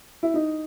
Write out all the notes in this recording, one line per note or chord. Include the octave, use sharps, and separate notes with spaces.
E4
D#4